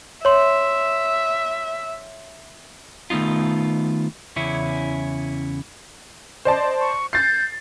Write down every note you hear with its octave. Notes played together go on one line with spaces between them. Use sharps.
C#5 E5 C6
D#3 A3 B3 D#4 F4
E2 C#3 C#4 E4
C5 D5 D#5 A5
C#6
G6 A6 C7